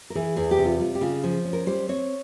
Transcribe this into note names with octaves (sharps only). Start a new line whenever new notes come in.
A#4
E3 G#4
E2 G#4
G4
C3
F4
G3 F4
G4
C#3 F4
F3 G#4
C#4
A#4
G3 C5
C4 C#5